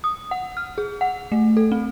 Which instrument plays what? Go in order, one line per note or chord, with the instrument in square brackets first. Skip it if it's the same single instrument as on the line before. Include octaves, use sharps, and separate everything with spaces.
[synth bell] D#6
F#5
F6
G#4
F#5
A3
A4
C4